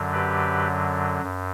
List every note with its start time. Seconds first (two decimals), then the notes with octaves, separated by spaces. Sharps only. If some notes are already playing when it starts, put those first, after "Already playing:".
Already playing: F#2 D3 F#3
0.12 G4 B4
1.22 F#2